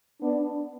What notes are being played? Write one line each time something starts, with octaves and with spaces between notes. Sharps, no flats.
B3 D4